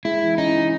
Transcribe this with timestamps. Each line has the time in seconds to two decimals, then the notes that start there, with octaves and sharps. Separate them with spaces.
0.05 G#3 E4
0.22 E3
0.38 C#4 D#4
0.55 E3